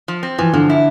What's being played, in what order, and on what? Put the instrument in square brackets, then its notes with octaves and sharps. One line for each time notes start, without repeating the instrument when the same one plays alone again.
[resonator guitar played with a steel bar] F3
C4
[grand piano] E3 [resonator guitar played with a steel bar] F3
[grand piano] D3 [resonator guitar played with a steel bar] F3
[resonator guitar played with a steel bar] E4